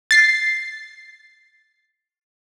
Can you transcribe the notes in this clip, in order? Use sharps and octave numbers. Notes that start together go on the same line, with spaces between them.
A6 C7